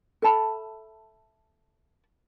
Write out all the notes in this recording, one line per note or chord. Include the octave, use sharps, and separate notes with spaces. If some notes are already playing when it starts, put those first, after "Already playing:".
A4 E5 A5 B5